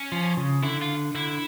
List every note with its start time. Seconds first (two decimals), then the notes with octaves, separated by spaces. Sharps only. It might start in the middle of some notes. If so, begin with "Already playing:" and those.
Already playing: C#4
0.12 F3
0.37 C#3
0.63 D3 E4
0.81 F4
1.15 D3 E4